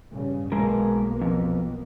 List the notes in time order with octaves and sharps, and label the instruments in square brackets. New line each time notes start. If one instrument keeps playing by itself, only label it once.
[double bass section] G2 C#3
[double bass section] B1 A#3 B3 [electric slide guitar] G#3 A#4
[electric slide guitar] F2